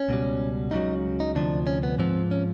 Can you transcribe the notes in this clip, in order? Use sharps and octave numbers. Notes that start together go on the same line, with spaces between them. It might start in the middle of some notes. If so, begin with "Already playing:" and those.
Already playing: C#4
C#2 B2 G3
C#2 C#3 F#3 D#4
D#4
D2 C3 F3 D4
C#4
B3
G#2 F3 C4
C#4